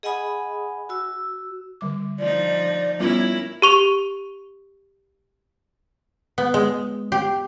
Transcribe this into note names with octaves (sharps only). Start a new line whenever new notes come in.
G#4 D#5 F#5 G#5 B5 D#6
F#4 E6
D3 G3 D6
F3 D#4 D5
G3 B3 C#4 E4 F4 A#4
G4 C#6 F7
B3
G#3
G4